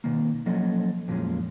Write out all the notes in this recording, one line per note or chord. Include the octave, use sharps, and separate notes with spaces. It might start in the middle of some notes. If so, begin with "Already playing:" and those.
B2 D#3 A#3
F3 F#3 A#3 C#4 A4 D#5
F2 A#2 F3 F#3 G#3 C#4